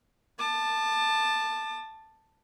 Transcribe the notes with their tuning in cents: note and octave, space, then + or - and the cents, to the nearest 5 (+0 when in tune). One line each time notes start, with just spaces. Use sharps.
A5 +0 D6 +40